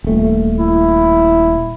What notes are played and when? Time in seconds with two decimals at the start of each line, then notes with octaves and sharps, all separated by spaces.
0.04 D#1 A3
0.58 E4